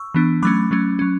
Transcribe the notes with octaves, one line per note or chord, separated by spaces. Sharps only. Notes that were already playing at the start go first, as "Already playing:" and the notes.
Already playing: C#6 E6
E3 B3 D4
F#3 A3 C#4 B5 D6
F#3 A3 C#4
F#3 C#4